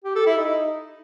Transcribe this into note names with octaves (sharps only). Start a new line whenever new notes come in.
G4
A4
E4
D#4